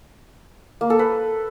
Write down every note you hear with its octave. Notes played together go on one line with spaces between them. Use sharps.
A#3
A4
B4